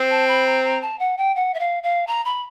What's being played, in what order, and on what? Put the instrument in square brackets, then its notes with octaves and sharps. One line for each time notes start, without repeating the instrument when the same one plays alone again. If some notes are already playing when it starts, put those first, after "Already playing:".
Already playing: [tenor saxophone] C4
[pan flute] A5
B5
A#5
A#5
A5
F#5
G5
F#5
E5
F5
F5
A#5
B5